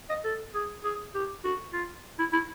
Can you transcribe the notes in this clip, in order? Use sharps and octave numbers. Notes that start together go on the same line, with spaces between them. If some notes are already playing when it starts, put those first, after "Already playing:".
D#5
A4
G#4
G#4
G4
F#4
F4
E4
E4